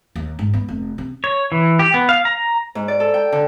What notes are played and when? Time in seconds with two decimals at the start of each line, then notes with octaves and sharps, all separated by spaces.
0.16 D#2
0.39 G#2
0.53 B3
0.68 F1
0.98 C3
1.24 C#5
1.52 E3
1.79 G4
1.94 B3
2.09 F5
2.25 A#5
2.75 G#2
2.88 D5
3.00 A4
3.14 G5
3.32 D3